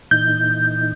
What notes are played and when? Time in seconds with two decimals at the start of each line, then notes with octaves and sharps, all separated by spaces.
0.11 A#2 E3 D#4 G6